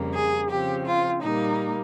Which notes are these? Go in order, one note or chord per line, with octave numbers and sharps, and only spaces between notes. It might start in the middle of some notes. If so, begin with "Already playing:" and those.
Already playing: F2 C#3 G3 A#3
G#4
C#3 F3 C4 G4
F4
A#2 G3 A#3 D#4